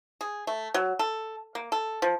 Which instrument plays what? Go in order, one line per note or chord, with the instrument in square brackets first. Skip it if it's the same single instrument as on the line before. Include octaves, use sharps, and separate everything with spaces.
[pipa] G#4
A3
F#3
A4
A#3
A4
F3